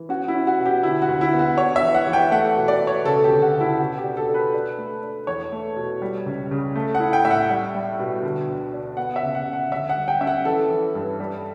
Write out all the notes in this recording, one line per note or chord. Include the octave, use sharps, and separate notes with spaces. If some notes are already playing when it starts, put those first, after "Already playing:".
Already playing: E3
C#4 F#4
E4
C#4
F#4
B2
G4
D3 E4
F#4
D2
E4
B3
F#4
D4 C#5
E5
E3
F#5
E3
G5
A3 F#5
B2
D5
B2
C#5
C#3 A4
G4
D2
F#4
C#3
E4
B2 F#4
G4
D4
A4
D4
B4
D4
A3
D4
E2 C#5
A3
B2
G3
C#2
C#3
A3
F#5
E4
G5
A2 E5
F#5
G3
G3
B2
D3
D2
D4
B3 F#5
E5
C#3
F#5
C#3
F#5
D2 E5
F#5
G3
G5
C#4 E5
F#5
E3 A4
E3
G2
G3